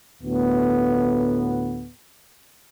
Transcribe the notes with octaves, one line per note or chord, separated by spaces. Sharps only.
D2 A2 B3